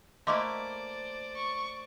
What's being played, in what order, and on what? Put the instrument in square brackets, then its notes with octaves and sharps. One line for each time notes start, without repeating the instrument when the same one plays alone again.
[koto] A3 A#3 E4 [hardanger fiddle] C5 D5 [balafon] D#5 C6 D6
[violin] C#6